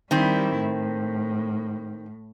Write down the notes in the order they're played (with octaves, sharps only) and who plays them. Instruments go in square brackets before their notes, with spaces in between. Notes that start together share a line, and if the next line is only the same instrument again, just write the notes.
[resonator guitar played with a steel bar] D#3 C4 [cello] G3 E4
[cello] A2